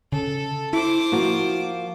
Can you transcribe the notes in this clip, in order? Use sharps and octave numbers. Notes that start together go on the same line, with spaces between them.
C#3 A4
E4 C5 D6
F3 A#3 F#4